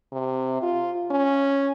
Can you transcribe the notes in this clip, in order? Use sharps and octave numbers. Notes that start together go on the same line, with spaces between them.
C3
F4
C#4